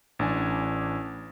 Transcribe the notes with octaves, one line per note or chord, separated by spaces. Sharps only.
A1 D4 G#5